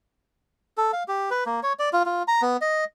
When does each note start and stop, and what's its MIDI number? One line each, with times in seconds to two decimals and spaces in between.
0.78 0.92 69
0.93 1.03 77
1.08 1.30 67
1.31 1.44 71
1.46 1.60 58
1.63 1.73 73
1.79 1.89 74
1.93 2.03 65
2.06 2.23 65
2.28 2.42 82
2.42 2.57 59
2.61 2.84 75